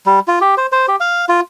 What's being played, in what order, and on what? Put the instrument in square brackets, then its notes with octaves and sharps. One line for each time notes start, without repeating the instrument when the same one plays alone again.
[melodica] G3
F4
G4
C5
C5
G4
F5
F4